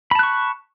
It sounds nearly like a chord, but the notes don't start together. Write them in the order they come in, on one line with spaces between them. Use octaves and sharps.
B5 A5 F#6 C#6